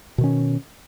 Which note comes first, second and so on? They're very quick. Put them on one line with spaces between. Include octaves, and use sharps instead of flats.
B2 D#3 C#4